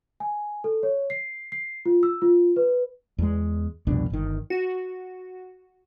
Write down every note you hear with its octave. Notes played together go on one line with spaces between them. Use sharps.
G#5
A4
C#5
C7
C7
F4
E6
F4
B4
E2 G#3
C2 F2 B2 D4
G1 D#3
F#4